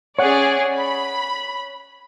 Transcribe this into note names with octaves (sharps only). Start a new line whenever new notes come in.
C#4 G#4 C#5 D5 F#5
B5